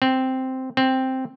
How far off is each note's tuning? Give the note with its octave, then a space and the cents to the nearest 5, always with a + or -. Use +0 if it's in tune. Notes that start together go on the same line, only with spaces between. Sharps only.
C4 -5
C4 +0